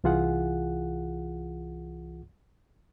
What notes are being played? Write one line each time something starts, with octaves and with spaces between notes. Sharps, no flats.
C2 E3 F4 G#4 F#5